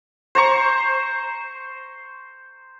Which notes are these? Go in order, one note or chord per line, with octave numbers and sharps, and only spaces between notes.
C5 A#5 C#6